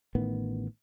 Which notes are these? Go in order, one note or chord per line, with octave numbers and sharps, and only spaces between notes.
A1 A2 D#3 B3